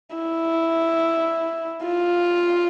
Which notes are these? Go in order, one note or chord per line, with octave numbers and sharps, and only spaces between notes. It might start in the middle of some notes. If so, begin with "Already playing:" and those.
E4
F4